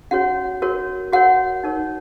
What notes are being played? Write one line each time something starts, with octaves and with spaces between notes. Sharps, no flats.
C#4 F#4 C#5 F#5
F#4 A#4 C#5
F#4 A#4 C#5 F#5
D#4 A#4 C#5